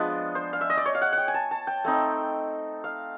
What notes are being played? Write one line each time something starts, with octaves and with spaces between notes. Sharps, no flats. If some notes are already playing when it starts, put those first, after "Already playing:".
Already playing: F3 G#3 B3 D4
C5
F5
E5
D#5
D5
C#5
F5
F#5
F#5 G5
G#5
A5
A5
G5
A3 C4 D#4
F5